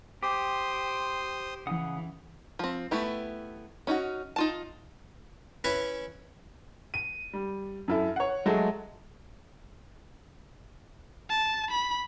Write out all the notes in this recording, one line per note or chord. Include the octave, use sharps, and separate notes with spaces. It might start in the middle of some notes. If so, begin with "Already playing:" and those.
G4 C5 C6 D6 D#6
C#3 E3 F#5 D#6
F3 C4
A3 B3 E4 G4
C#4 D#4 F4 F#4
D#4 F4 A5
C#4 E4 B4 E5 G#5
D#7
G3
F#2 E4 A4
C#5 F#5
F#3 G#3 A3 A5
A5
B5